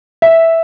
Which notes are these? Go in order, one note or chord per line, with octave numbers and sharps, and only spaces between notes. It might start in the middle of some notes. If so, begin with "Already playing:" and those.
E5